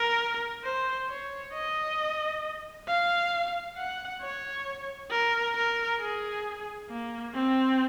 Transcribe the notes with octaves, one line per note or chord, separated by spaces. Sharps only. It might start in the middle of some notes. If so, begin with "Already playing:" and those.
Already playing: A#4
C5
C#5
D#5
F5
F#5
C#5
A#4
A#4
G#4
A#3
C4